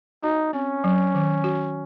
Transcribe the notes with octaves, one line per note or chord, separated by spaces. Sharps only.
D#4 F#4
C4 C#4
F#3
D#3
F#4